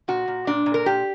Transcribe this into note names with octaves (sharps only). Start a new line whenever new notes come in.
A#2 F#4
A#2
A#2 D4
A#2
A#4
A#2 G4